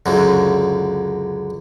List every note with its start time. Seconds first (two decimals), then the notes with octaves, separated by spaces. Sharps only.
0.06 C#2 F#2 D3